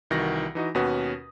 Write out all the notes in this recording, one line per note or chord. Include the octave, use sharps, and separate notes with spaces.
C2 D#3 E3 F#4 A#6
E3 D#4 F#4 D#5
D#2 B2 C#4 F#4 B4 D#6